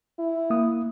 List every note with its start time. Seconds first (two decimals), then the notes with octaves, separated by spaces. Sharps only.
0.19 E4
0.50 A#3 D#6